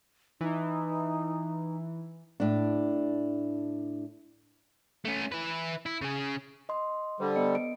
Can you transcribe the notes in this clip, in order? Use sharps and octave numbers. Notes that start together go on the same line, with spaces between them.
E3 D#4
A2 D4
A3 C#4
E4 B4
E4
C#3 G#4
D#5 C6
D3 G3 C5
B3 D#5 C#7
D7